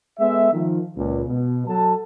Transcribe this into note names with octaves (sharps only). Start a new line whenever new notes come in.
G#3 B3 A4 E5
D#3 F3
C#2 A#2
B2
F#3 A4 A5